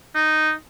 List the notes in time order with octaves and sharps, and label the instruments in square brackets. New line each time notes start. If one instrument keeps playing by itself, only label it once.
[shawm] D#4